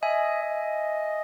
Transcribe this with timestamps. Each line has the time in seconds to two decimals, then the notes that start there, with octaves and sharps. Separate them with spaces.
0.02 D#5 E5 G#5
0.42 D#5